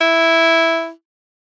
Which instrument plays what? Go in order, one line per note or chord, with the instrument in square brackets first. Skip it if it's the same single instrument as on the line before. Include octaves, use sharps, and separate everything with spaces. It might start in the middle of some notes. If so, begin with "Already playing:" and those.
[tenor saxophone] E4